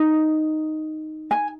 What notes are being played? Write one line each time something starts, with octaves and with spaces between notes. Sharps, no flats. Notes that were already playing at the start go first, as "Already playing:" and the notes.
Already playing: D#4
G#5